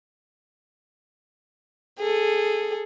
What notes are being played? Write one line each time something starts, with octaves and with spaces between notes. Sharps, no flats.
G#4 A4